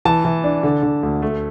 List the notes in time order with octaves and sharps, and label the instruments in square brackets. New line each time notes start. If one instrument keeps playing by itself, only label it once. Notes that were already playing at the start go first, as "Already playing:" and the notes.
[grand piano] E3 A5
E3
D4
D3
D3
D2
A3